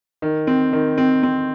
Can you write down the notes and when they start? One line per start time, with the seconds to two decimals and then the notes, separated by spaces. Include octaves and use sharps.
0.22 D#3
0.47 C4
0.73 D#3
0.98 C4
1.23 C4